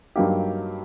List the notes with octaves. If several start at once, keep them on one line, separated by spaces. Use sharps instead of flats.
G2 F#3 A#3 D#4 G4